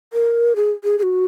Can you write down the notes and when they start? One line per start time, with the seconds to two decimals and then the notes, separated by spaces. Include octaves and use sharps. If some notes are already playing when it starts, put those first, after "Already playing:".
0.13 A#4
0.56 G#4
0.84 G#4
0.99 G#4
1.03 F#4